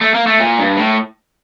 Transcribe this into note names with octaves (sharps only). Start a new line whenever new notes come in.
A3
A#3
A3
A#2
G2
A2